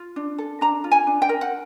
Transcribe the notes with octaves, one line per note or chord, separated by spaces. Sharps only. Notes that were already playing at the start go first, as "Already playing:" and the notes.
Already playing: F4
D4
A4
D4 A#5
F4
G#5
D4
G5
A#4
F#5